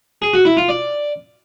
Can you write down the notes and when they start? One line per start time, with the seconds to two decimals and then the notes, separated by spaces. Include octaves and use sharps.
0.22 G#4
0.34 F#4
0.45 E4
0.57 F4
0.69 D5